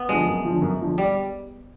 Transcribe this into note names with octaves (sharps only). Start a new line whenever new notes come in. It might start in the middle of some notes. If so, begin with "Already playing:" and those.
Already playing: B3
D3 F3 G#3
F#2
D3 F3
F#2
D3 F3
G3